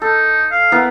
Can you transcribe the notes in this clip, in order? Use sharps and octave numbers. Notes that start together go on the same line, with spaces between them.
D#4 A4
F5
B3 E4 A#4